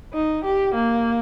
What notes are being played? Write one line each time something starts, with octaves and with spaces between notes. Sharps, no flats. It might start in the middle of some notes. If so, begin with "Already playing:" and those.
D#4
G4
A#3